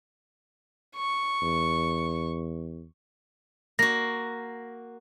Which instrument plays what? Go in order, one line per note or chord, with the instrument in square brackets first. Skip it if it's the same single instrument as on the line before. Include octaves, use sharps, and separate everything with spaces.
[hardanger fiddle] C#6
[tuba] E2
[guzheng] A#3 F#4 [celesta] A#6